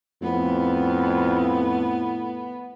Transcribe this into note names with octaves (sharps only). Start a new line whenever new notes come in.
F2 A2 B3